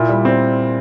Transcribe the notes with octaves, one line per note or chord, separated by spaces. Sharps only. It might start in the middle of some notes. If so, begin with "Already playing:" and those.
Already playing: A#2 E4
G3
C4